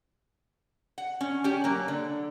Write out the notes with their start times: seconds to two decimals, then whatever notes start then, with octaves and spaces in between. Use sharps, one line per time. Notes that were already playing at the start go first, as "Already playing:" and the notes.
0.98 F#5
1.21 C#4
1.44 C#4 G4
1.64 F#3 A#3
1.88 D3